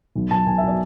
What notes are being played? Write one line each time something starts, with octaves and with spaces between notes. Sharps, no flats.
B1
B2 F#3 A5
B1 G#5
E5
B2 F#3 D5